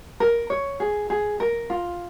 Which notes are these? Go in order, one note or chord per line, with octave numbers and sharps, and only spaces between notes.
A#4
C#5
G#4
G#4
A#4
F4